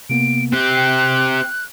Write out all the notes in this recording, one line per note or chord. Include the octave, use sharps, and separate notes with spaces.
C3 A#3 B3 D7
C4 G4 F#6
G5 C7